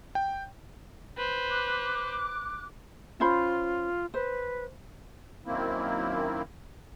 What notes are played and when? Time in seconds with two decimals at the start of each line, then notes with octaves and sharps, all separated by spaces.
0.15 G5
1.18 B4 C5
1.50 D6 F#6
3.20 C#4 F4 C5 B5
4.14 B4 C5
5.46 F#2 D#3 A#3 C4 E4